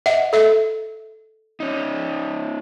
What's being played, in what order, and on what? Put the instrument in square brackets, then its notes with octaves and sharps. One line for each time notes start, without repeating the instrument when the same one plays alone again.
[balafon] D#5 E5 F#5
A4 E5
[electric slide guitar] C#4 D#4